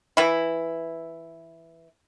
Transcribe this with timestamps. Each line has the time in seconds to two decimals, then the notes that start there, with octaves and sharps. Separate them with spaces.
0.17 E3 E4